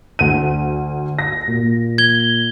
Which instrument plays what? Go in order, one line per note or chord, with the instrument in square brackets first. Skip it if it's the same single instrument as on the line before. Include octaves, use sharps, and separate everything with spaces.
[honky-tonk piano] D2 D#7
A#6
A#2
[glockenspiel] G#6 G7